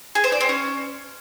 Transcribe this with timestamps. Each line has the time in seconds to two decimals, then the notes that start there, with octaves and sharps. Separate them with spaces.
0.15 G#4
0.24 C5
0.32 D5
0.41 C4
0.49 C#4